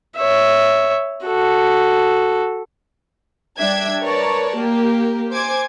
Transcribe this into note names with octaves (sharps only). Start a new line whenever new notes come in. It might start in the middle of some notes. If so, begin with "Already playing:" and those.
C#5 E5
F#4 A4
G3 D4 E5 G5 G#6
A#4 B4 C#5 D5 A5 A#5
A#3 G4 A#4
C5 G#5 D6 G#6